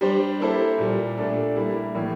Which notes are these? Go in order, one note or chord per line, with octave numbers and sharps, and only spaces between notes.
G3 D4 G4 C5
A#3 E4 A4 C5
A#2 G3 A#3
A#2 A3 D4 A4
G3 A#3 E4
A2 E3 A#3